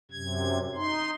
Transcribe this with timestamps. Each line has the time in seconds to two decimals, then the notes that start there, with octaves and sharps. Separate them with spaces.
0.11 F#2 C3 G#6
0.75 D#4 C6